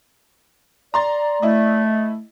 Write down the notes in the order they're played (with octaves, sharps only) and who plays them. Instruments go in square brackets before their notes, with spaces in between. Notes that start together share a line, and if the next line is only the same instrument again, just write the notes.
[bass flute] D5 [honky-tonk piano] A#5 C6 A6
[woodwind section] A3 [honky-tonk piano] E4 D#5